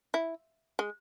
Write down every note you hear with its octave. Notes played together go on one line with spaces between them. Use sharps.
E4
G#3